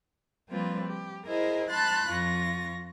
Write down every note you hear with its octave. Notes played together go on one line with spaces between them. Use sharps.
F3 G3 A#3 C4 F4 B4
G4
E4 G#4 A#4 C5 D#5
A5 B5 C6 F#6 A6
F2 F4 C#6 A#6